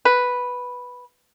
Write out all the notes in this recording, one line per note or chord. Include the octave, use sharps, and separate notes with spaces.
B4